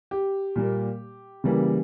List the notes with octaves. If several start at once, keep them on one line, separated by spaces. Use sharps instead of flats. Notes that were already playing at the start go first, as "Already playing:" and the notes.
G4
A#2 G3 A#3
C#3 E3 G3 A#3